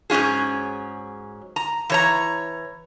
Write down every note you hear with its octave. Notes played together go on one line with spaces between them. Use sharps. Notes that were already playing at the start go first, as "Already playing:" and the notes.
G#2 F#3 C#4 F#4 G#4
A#5
E3 C#5 A#5